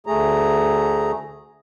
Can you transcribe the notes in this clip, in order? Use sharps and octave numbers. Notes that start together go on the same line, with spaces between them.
D2 A3 G#4 A#5